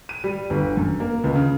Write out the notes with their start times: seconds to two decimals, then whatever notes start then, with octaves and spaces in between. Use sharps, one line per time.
0.09 D#7
0.24 G3
0.50 G1
0.77 F#2
1.00 A#3
1.24 C#2
1.36 C#3